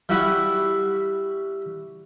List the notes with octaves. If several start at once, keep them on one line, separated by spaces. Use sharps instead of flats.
G3 E4 F#4 B5